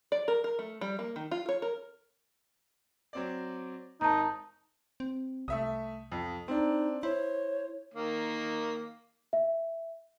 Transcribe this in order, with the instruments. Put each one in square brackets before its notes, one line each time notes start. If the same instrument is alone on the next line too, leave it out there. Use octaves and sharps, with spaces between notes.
[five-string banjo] D5
A#4
A#4
A3
G3
A#3
D#3
F4
C#5
A#4
[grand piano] F#3 C4 D5
[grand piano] G#1 [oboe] D#4 [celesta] A5 A#5
[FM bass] C4
[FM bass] C2 [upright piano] A3 E5 D#6
[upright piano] F2
[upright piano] C4 D4 [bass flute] D#4
[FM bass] E4 [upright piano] C5 [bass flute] C#5
[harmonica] D#3 A#3
[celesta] E5